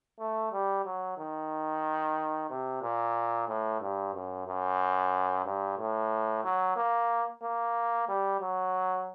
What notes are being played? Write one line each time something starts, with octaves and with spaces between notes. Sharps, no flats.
A3
G3
F#3
D#3
C3
A#2
A2
G2
F#2
F#2
G2
A2
F#3
A#3
A#3
G3
F#3